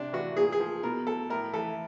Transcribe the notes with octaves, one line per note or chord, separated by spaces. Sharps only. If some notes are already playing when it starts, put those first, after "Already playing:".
Already playing: C3 D4
E3 F#4
A#2 G#4
G#4
F3
B2 A#4
A4
A2 A#4
E3 A4